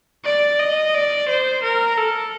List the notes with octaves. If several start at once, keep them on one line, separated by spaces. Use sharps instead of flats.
D5
D#5
D5
C5
A#4
A4